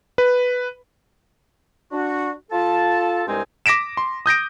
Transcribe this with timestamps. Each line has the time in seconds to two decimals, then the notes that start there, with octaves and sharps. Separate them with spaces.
0.18 B4
1.92 D4 F#4
2.51 F4 A4 A5
3.27 C2 G2 G#3 C4 D#4 G#5
3.66 D6 A#6 B6 D7 E7
3.97 C6
4.26 D#6 G6 A#6 D7